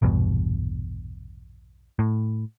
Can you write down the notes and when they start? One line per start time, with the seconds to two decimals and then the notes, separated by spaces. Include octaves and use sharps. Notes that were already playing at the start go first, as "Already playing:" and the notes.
0.02 A#1 E2 G2 B2
1.99 A2